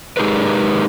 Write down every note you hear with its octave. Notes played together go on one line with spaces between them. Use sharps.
G#3 D#4 G4 G#4 A#4 B4